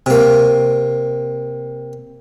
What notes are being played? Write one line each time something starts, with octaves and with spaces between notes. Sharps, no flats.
C3 A#3